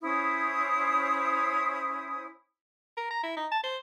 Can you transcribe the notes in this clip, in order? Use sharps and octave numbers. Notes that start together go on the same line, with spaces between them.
C#4 E4 C5 D#6
A#4
A#5
E4
D#4
A5
C5